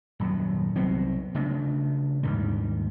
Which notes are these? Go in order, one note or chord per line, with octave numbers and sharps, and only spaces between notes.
D#1 F#2 F#3
C2 F#3 B3 C4
C#3 A3 D4
D#2 G#2 D3 G3